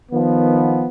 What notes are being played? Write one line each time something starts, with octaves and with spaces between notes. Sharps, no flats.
D#3 F3 B3